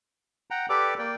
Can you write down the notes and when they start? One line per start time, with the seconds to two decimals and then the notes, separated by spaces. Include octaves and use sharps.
0.50 F#5 G5 A#5
0.69 G4 A4 B4 D5 D6
0.99 A#3 D5 G5